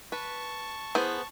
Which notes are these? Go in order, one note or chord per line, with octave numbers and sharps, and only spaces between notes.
B4 A5 C#6
E3 B3 G#4 C5